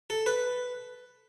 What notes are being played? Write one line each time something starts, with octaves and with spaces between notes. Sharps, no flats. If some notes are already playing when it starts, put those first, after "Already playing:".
A4
B4